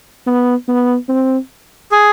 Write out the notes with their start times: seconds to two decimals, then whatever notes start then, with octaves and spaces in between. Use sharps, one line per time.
0.26 B3
0.68 B3
1.09 C4
1.92 G#4